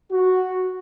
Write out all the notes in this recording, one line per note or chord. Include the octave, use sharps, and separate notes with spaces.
F#4